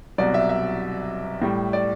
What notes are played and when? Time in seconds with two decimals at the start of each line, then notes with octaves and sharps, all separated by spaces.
0.18 C2 B2 F#3 D5
0.34 E5
0.49 E5
1.42 A2 G3
1.73 D5